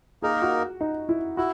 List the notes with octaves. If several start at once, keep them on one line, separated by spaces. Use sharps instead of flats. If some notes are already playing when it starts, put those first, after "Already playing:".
A#3 D#4 G#4 A#4
F#4
D#4
E4
E4 F#4